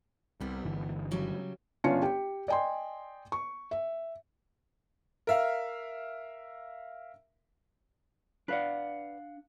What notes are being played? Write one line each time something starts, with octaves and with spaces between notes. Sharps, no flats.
C2 C3 G3 B3 G#4
G1 D3 E3
C#3 F#3 G3
G1 C#4 D4 F4 C#7
G4 G5
D5 D#5 G5 G#5 C6
C#6
E5
A#4 E5 F5
D4 B4 D5 F5 F#5